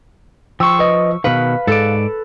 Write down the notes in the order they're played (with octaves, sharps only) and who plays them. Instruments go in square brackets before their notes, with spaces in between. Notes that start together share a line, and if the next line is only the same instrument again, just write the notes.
[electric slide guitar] F3 [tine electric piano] G5 C6 [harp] C#6 E6
[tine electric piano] B4 D#5
[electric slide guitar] B2 D#3 [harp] B4 [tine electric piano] F5
[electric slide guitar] G#2 D5 [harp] A4